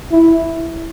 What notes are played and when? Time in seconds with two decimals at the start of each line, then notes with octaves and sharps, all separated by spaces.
0.11 E4